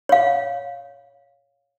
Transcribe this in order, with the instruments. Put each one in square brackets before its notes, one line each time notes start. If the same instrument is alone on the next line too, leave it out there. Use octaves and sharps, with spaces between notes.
[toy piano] C#5 F5